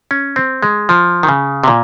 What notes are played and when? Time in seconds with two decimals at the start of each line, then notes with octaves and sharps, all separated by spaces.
0.11 C#4
0.36 C4
0.63 G#3
0.89 F3
1.23 D#3
1.29 C#3
1.64 C3
1.68 A#2